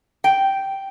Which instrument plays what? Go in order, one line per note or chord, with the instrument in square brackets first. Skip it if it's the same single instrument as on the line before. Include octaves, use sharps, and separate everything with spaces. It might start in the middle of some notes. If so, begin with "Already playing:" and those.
[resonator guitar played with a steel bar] G5